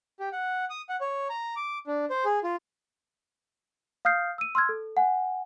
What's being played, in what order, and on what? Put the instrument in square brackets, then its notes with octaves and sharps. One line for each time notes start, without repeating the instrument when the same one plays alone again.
[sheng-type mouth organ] G4
F#5
D#6
F#5
C#5
A#5
D6
D4
C5
G#4
F4
[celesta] F5 D#6 F6 G6 C7
E6 D#7
C6 E6 F6 G#6
A4
F#5 G#5